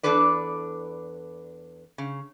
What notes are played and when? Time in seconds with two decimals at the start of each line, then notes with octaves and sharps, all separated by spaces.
0.03 E2 G2 D4 A4 B4 D5
1.98 C#3